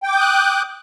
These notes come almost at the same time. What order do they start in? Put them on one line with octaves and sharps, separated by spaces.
G5 D6 G6 D#6 F#6